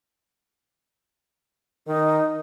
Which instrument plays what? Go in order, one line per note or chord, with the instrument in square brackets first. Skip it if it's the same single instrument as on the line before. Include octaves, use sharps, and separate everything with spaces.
[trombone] D#3 [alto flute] D#4